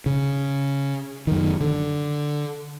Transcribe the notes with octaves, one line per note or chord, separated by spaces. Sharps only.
C#3
F#2 D#3
D3